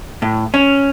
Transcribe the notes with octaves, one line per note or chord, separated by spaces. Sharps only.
A2
C#4